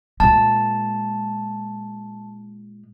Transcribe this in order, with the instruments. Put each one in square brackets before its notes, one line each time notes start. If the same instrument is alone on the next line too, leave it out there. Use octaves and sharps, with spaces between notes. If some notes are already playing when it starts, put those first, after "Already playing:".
[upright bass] A#2 G#3 [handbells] A5